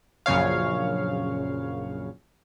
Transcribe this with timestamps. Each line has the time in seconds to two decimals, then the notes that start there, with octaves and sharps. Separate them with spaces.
0.26 A#1 F#2 C#3 C#5 F5